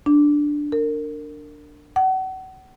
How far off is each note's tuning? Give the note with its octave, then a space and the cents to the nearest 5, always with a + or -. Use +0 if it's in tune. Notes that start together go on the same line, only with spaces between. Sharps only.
D4 +0
A#4 -25
F#5 +35